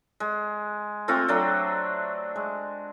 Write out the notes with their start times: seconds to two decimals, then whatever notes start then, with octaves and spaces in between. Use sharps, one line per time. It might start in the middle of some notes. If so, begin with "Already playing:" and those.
0.20 G#3
1.08 A3 C4 F4 F#4
1.28 F#3 A3 D4
2.36 G#3